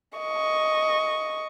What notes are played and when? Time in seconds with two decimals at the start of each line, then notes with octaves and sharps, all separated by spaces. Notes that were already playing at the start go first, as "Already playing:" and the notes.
0.18 D#5 C#6